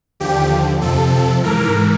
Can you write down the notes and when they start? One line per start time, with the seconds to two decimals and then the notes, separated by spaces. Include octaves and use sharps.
0.20 D#2 D3 F3 G4
0.81 F2 C3 F3 A4
1.44 G#2 E3 A#4